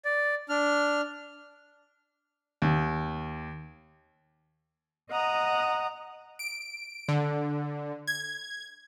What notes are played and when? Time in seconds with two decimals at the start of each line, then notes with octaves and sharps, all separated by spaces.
0.05 D5
0.49 D4 F6
2.62 D#2
5.10 D#5 F#5 A#5 D#6
6.39 D7
7.08 D3
8.08 G#6